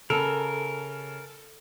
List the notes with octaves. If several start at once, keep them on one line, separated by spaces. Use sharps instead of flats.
C#3 A4 A#4